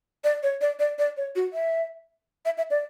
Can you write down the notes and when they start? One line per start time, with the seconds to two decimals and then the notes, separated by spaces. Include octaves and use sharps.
0.24 D5
0.43 C#5
0.61 D5
0.79 D5
0.99 D5
1.17 C#5
1.36 F#4
1.53 E5
2.45 E5
2.58 E5
2.70 D5